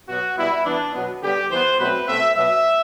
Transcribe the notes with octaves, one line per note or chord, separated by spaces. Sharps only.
B2 F#3 B3 F#4
B2 G3 B3 E4
E3 B3 D4
B2 F#3 B3
D3 G3 B3 G4
E3 B3 C5
B2 F#3 A3 C4 B4
B2 A3 C4 E5
B2 F#3 B3 E5